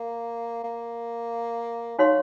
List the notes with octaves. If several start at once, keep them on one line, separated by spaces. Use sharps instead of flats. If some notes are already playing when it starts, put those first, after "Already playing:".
Already playing: A#3
A#3
F#3 D#4 F#4 C#5 F5 C6